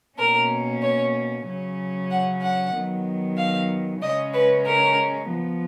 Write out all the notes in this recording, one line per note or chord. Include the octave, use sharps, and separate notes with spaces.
B2 A#3 C#4 A#4
C#5
C#3 F#3 C#4
F#5
F#5
D#3 F#3 B3
F5
C#3 G#3 C#4 D#5
B4
A#4
F3 B3